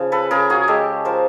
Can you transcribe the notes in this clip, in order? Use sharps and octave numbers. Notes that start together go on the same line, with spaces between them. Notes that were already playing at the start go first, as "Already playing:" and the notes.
Already playing: C#3 F3
A4 B4
C#3 G#4 A#4
F#4 G#4
G#3 G4 A4
F3 A#4 C5